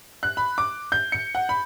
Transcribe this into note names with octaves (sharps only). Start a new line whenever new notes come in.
F#6
B5
D6
G6
C#7
F#5
B5